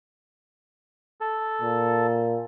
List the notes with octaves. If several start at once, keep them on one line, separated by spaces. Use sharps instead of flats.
A4
A#2